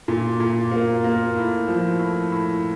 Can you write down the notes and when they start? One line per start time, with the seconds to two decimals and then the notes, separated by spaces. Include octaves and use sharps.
0.08 A#2
0.40 A#2
0.71 A#3
1.04 A#3
1.36 A2
1.68 F3
1.99 A2
2.32 A2